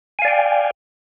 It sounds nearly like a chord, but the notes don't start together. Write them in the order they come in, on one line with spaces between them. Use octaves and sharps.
G#5 F5 D5 G5